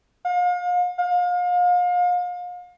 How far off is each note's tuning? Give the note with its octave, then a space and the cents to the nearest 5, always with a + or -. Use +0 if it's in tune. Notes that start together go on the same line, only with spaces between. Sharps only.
F5 +40
F5 +35